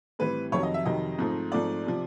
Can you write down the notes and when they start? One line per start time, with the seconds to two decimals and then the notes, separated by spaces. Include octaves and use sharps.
0.19 A2 E3 G3 C4 B4
0.52 F2 C3 D#3 F#3 C#5
0.63 D#5
0.74 E5
0.85 F2 C3 D#3 F#3 D#5
1.19 G#2 F3 A3 C4
1.52 G#2 F3 A3 C4 D5
1.86 C3 F3